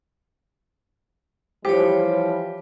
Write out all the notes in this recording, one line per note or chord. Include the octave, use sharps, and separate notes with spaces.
E3 F3 G3 G4 C5 C#5